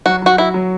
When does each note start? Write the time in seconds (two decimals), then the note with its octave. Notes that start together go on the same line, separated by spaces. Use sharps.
0.06 F#3 F#4
0.22 F#3 F#4
0.38 E4 F#4
0.54 F#3